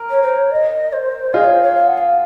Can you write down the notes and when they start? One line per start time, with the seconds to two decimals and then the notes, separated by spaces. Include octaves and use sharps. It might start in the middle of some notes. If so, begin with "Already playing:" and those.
Already playing: A#4
0.10 C#5
0.22 C5
0.36 C#5
0.51 D#5
0.93 C5
1.34 F4 G#4 D#5
1.44 C#5
1.53 C5
1.63 C#5
1.75 F5
1.87 F#5
1.98 F5